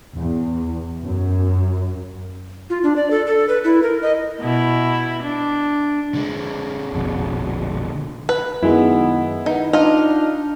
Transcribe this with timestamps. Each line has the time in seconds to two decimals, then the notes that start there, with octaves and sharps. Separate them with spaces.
0.17 E2
1.03 F#2
2.70 F4
2.83 D4
2.96 D5
3.11 A4
3.27 A4
3.49 B4
3.64 E4
3.83 A#4
4.02 D#5
4.41 B2 E4
5.23 D4
6.15 D3 G#3
6.93 F1 A#1 B2
8.29 B4
8.63 F#2 D#3 G#3 B3 E4
9.46 D#3 B3 D#4
9.73 D4 D#4 F4 D#5 F6